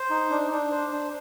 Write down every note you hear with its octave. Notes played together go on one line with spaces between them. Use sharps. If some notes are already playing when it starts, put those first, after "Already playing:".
Already playing: C5
D#4
D4
D4
C5
D4